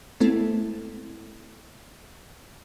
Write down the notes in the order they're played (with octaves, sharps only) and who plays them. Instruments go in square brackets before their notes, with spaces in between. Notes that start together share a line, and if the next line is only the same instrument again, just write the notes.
[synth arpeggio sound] G#3 A3 B3 C4 E4 A4